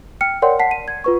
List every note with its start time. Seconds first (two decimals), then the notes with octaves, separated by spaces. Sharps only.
0.21 G5 F6 C#7
0.42 A#4 C#5 D5 F#5 G5 C6
0.59 F#5 A5 B6 C7
0.71 D#7
0.88 G#6
1.04 F4 B4 C#6